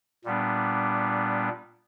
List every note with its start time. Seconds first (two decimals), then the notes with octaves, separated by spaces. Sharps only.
0.24 A#2 G3 B3 D4